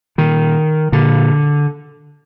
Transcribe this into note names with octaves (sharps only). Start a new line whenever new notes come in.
A#2 D#3
A#2 D3